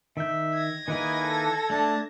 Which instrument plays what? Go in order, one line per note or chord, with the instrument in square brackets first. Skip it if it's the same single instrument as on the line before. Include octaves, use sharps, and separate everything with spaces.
[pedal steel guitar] D#3 G6 [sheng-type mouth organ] E5
[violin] G#6 A#6
[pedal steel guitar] D#3 E4 G#4 [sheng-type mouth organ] A#3 B4 G#5 [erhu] D#5
[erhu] A4
[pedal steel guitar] A3 [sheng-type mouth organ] D4 A5